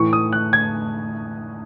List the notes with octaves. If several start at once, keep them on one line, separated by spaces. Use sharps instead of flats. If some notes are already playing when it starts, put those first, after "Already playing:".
Already playing: A2 E3 C#6
D#6
F#6
G#6